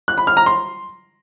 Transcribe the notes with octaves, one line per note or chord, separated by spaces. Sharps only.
F#6
B5
F6
A#5
C6